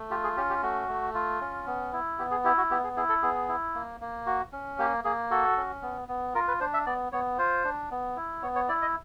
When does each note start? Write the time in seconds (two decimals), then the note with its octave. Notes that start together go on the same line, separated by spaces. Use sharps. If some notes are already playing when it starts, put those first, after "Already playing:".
Already playing: A3
0.11 F4 G4
0.24 G#4
0.37 C#4 G4
0.50 G4
0.63 A3 F#4
0.88 A3
1.14 F4
1.41 C#4
1.66 B3
1.93 E4
2.19 B3 G4
2.31 G#4
2.45 E4 G4
2.57 F#4
2.71 B3 G4
2.84 G#4
2.97 E4 G#4
3.09 A4
3.22 B3 G#4
3.49 E4
3.75 A#3
4.01 A#3
4.26 F#4
4.52 C#4
4.79 A#3 G4
5.04 A#3 G#4
5.31 F#4 A4
5.57 C#4
5.82 B3
6.08 B3
6.35 F4 A#4
6.48 B4
6.60 D4 C5
6.74 E5
6.86 B3 D5
7.12 B3 C#5
7.38 F4 C5
7.64 D4
7.91 B3
8.16 E4
8.42 B3 C#5
8.55 C#5
8.68 E4 D5
8.82 D#5